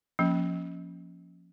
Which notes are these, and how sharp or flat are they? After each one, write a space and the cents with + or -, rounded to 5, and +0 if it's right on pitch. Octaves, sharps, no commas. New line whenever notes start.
F3 +0 A#3 +15 C#4 +0